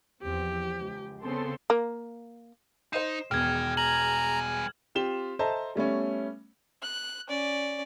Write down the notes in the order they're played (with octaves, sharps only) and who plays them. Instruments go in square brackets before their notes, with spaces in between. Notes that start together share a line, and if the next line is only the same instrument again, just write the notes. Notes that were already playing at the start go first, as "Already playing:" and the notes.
[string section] E2 F3 C4 [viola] G4
[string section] C#2
[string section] C#3 A4 C6 [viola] B3 C4
[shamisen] A#3
[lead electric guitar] D#4 [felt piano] C5 D#5 C7 [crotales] E7
[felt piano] E1 E2 [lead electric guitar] D#3 [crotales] F6 G#6
[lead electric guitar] G3 G#5 [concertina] A#5 [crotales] F#7
[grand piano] C4 F4 G4 E7 G7
A4 C5 D#5 E5 A5 A#5
G3 A3 B3 C#4
[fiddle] F#6
C#4 D5